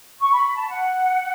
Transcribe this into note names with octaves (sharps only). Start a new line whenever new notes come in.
C#6
B5
B5
A5
F#5